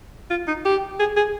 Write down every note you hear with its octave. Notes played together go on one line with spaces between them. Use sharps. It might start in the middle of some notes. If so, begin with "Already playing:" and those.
F4
D#4
G4
G#4
G#4